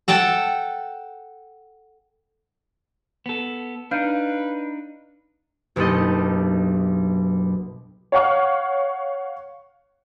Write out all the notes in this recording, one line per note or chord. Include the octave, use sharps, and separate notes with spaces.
A4 F#5 G5 A5
B3 A4
D4 D#4 B4 F5 F6 G6
F#1 B1 D4 G4 A4 D#5
C#5 F5 F#5 C#6 F6